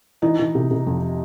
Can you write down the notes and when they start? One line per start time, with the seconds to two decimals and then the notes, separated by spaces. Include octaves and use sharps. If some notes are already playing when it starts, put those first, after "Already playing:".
0.22 E3 D#4
0.39 E3
0.55 C3
0.71 C3
0.87 F2